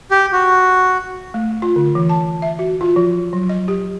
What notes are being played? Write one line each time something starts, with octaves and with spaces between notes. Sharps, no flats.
G4
F#4
A3
F4
D3
E3
A5
E5
F#4
F4
F3
F#3
D#5
G4